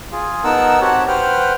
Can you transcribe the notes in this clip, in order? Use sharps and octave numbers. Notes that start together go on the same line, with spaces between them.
F4 G#4
B3 D#4 A#4 F#5 A5 E6
C4 F#4 G4 C#5 F#5 A5
B4 C5 F#5 G5 F6